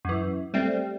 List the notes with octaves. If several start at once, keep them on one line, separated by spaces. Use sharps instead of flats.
F#2 E3
G3 A3 C4